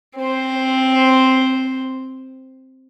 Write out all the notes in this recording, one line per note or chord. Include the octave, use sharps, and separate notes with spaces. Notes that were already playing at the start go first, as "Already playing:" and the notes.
C4 C5